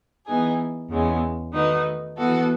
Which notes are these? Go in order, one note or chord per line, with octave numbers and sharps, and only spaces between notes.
E3 B3 D#4 G#4
E2 C#3 G#3
D#3 A3 D#4 F#4 B4
E3 B3 F#4 A4